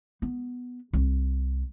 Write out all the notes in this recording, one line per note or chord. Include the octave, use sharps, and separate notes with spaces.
B3
C2